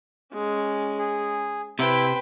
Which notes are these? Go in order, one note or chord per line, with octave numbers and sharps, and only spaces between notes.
G#3 C#4
G#4
C3 E4 B4 C5 E5 G5